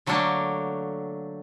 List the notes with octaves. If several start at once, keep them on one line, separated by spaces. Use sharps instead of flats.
D3 F#3 A3 A#3 D4